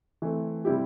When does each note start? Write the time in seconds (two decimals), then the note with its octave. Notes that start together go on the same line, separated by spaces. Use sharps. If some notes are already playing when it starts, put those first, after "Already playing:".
0.22 E3 A3 C4
0.65 C3 G3 C4 E4 G4